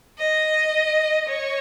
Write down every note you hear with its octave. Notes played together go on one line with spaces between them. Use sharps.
D#5
C#5